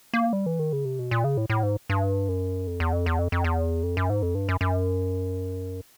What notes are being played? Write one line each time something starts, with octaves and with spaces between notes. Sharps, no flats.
A#3
G3
E3
D#3
C#3
C3
B2
A#2
C#3
A2
A2
G#2
G2
F#2
F2
E2
F2
E2
F2
F2
E2
F2
F#2
G#2
F2
G2
F#2
F#2